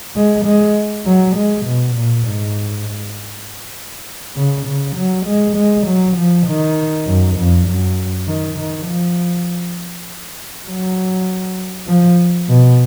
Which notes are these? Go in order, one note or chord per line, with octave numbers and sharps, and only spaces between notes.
G#3
G#3
F#3
G#3
B2
A#2
G#2
C#3
C#3
F#3
G#3
G#3
F#3
F3
D#3
F#2
F2
F#2
D#3
D#3
F3
F#3
F3
B2